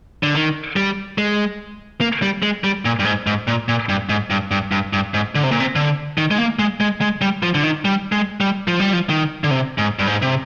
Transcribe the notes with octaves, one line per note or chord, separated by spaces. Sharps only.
D3
D#3
G3
G#3
A#3
G3
G#3
G3
A#2
G2
G#2
G#2
A#2
A#2
G2
G#2
G2
G2
G2
G2
G#2
D3
C3
A#2
C3
D3
D#3
G#3
A#3
G#3
G#3
G#3
G3
F3
D3
D#3
G3
G#3
G3
F3
G3
F3
D#3
D3
C3
G#2
G2
G#2
C3